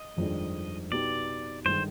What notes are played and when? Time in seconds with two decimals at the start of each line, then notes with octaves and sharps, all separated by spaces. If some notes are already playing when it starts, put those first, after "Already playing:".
Already playing: D#5
0.16 G1 F2 D#3 G#3 D4
0.91 B2 B3 D#4 G4 D5
1.65 G1 D#3 G#3 C5